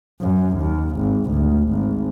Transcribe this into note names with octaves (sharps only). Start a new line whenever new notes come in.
F#2
D#2
G#1
D2
G#1